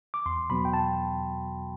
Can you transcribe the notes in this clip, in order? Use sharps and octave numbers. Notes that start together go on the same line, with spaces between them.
D6
E2 C6
B2 F#3 B3 B5
G5
A5